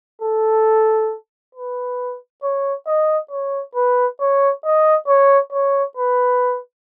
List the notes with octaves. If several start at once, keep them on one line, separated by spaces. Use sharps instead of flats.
A4
B4
C#5
D#5
C#5
B4
C#5
D#5
C#5
C#5
B4